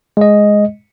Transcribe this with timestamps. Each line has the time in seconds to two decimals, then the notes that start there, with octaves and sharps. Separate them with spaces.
0.17 G#3 D#5